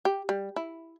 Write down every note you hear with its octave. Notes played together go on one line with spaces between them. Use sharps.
G4
G3
E4